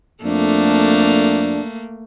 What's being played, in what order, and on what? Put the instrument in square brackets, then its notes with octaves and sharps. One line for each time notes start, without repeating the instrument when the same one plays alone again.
[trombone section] F2 D4 [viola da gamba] A3 A#3